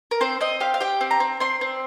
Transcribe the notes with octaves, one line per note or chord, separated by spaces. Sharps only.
A#4
C4 C5
C4 D#5
G4 F5
F5
G4 G5
C4
A#5
C4
C4 C6
C4